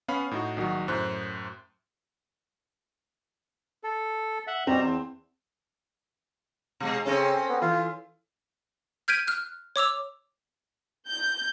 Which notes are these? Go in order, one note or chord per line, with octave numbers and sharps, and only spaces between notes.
B3 C#4 F5 F#5 B5
A2 D#4 F#4
A#1 D#3 F#3 F#4
F#2 A2 C5 F#6
A4
E5 F#5
B2 G3 C4 A#5
E2
B2 G#3
C#3 C4 C#4 A4
B3
E3 F4
F6 G6 G#6 B6 D7 D#7
F6 F#6
C#5 D6 E6 F7
G6